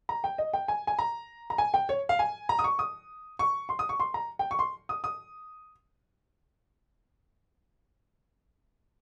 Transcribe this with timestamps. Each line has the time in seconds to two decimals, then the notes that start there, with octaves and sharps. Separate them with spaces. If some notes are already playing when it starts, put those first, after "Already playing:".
0.09 A#5
0.24 G5
0.38 D#5
0.54 G5
0.68 G#5
0.87 G#5
0.99 A#5
1.50 A#5
1.58 G#5
1.74 G5
1.89 C#5
2.09 F5
2.19 G#5
2.49 A#5
2.59 D#6
2.64 C#6
2.79 D#6
3.39 C#6
3.69 C6
3.79 D#6
3.89 C#6
4.00 C6
4.14 A#5
4.39 G5
4.51 C#6
4.59 C6
4.89 D#6
5.04 D#6